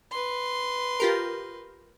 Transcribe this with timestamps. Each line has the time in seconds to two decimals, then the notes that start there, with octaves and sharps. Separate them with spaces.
0.11 B4 C6
1.00 F4 G4 A#4